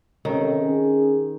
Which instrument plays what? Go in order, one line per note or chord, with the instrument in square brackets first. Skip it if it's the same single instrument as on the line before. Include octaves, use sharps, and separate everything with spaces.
[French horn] C3 [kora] D#3 [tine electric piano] C#4 A4 C#5
[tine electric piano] C#4 [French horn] G#4